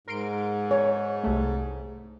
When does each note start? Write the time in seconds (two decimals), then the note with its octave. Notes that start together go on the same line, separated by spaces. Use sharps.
0.07 G#2 A#4 C6 D7
0.71 C#5
1.23 C2 A3